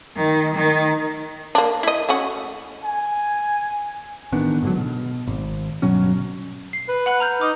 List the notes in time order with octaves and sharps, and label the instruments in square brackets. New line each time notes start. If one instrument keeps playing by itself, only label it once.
[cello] D#3
D#3
[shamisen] A#3 D4
E4 D#5
A3 C#4 F#4
[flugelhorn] G#5
[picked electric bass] A1 D#3 B3 D4
G#2 D3 F#3
B2
G#1
G1 B2 F#3 C#4
[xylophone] C7
[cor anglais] B4
[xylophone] F#5 B5 F#6
A#5 F6 G6
[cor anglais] D#4 [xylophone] D6